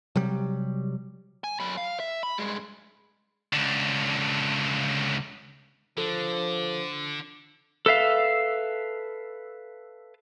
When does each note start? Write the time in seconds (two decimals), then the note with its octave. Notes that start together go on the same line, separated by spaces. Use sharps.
0.15 C3 F#3 G3
1.44 G#5
1.60 F#2 B5
1.77 F5
2.00 E5
2.23 B5
2.38 G2 G#3
3.53 C#2 D3
5.98 D3 F3 A4
7.86 A4 B4 E5 F5